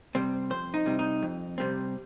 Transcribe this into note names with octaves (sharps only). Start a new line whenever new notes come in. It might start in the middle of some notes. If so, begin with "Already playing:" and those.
C3 G3 C4
F2 C5
D#4
C3 G3 C4
D#4
F2
C3 G3 C4